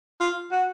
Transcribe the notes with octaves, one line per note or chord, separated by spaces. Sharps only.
F4
F#4